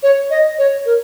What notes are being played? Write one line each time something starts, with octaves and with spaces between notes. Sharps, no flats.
C#5
D#5
C#5
A#4